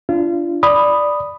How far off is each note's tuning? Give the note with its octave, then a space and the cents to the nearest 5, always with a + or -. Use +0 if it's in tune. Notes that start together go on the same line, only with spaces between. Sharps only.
D4 -10 F4 -30
D5 +0 B5 +0 D#6 -5